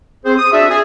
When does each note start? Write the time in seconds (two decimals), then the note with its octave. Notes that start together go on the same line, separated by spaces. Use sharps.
0.25 C4 G#4 C5
0.37 D#6
0.52 D4 F#4 G#4 D5 E5
0.69 G#4